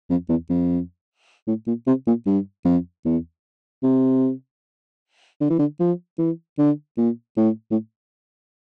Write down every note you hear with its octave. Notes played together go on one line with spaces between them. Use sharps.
F2
E2
F2
A2
A#2
C3
A#2
G2
F2
E2
C3
D3
E3
D3
F3
E3
D3
A#2
A2
A2